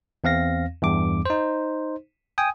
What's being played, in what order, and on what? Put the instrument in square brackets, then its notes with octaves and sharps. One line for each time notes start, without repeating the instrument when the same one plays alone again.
[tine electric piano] E2 C4 F5 A#6
E2 G2 D6
D#4 C5
G5 G#5 D#6